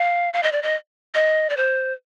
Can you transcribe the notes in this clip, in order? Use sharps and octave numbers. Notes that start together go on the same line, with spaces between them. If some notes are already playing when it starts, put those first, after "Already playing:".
Already playing: F5
F5
D#5
D5
D#5
D#5
D5
C5